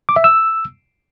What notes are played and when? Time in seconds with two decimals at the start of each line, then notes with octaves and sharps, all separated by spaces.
0.09 D6
0.16 E5
0.24 E6